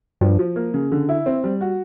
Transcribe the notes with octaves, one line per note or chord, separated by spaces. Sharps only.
G2 F3
F3
A#3
C#3
D3
E4
C4
G3
F#4